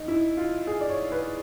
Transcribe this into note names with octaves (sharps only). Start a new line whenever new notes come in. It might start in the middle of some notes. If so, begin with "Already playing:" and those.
Already playing: D#4
E4
F4
G#4
D5
C#5
B4